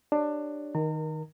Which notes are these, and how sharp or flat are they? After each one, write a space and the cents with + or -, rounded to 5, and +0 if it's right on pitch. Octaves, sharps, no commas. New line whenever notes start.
D4 +20 G4 +0 C#5 +25
D#3 +0 A#4 +20 A#5 -40